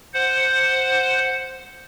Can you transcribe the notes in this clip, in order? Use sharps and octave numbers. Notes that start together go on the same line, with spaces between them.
C5 F#5